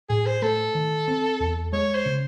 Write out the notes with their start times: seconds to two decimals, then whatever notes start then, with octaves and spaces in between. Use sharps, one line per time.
0.09 A2 G#4
0.26 C5
0.42 A3 A4
0.75 D#3
1.08 C4
1.40 E2
1.73 G#3 C#5
1.95 C5
2.06 C#3